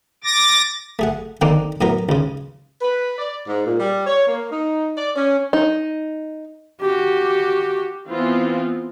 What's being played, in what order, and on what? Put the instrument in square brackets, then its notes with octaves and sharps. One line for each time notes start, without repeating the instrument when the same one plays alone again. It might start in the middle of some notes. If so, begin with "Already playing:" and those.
[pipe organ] D6 A6 A#6
[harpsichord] A3 G#4 F#5
D3 D#3 A#3 C4 D4 D#4
A2 F#3 B3 A#4
C#2 C#3
[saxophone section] B4
D5
G#2
A#2
G3
C#5
A#3
D#4
D5
C#4
[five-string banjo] D#4
[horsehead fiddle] F#4 G4
[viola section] E3 B3 C4 F4